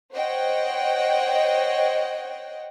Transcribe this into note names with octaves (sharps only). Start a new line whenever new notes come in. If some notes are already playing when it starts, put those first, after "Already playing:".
C5 C#5 D#5 F#5 G5